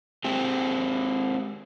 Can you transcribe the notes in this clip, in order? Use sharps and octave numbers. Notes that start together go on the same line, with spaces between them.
G#3 C4 G4